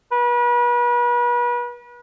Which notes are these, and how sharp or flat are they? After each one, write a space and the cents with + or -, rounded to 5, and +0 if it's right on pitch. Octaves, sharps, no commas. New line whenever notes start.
B4 -35